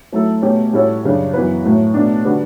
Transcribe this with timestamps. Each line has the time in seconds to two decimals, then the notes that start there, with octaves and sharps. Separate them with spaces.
0.12 F#3 A3 E4 A4
0.42 B2 A3 C#4 G4
0.73 A2 G3 C#4 F#4 A4
1.04 F#2 C#3 G3 D4
1.34 F#2 E3 B3 F#4 B4
1.64 A2 F#3 A3
1.94 B2 A3 D4
2.25 D3 G3 D4 F#4 B4